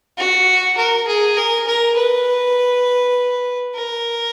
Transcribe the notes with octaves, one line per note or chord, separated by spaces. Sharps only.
F#4
A#4
G#4
A#4
A#4
B4
A#4